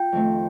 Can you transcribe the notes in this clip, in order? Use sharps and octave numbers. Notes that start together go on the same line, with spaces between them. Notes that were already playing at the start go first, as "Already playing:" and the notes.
Already playing: F4 G5
F2 D#3 A3 C4